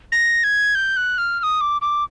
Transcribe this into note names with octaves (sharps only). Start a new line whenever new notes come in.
A#6
G#6
G6
F#6
F6
F6
D#6
D6
D6